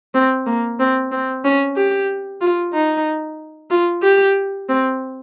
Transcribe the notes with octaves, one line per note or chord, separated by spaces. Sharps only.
C4
A#3
C4
C4
C#4
G4
F4
D#4
F4
G4
C4